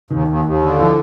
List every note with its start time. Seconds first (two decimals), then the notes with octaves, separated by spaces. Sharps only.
0.10 D#2 D#3
0.28 D#2
0.45 D#2
0.62 D3
0.79 E3 F3